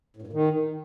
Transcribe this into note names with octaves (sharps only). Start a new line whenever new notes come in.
A2
G2
A#2
D#3